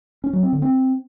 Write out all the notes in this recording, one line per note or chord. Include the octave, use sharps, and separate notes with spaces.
C#4
F#3
C4
D3
C4